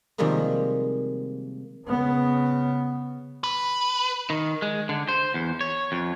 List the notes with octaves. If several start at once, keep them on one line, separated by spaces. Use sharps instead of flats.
C3 D#3 F3 G3 G#3 A#3
C#3 B3
B4
D#3
G#3
D3
C5
E2
C#5
F2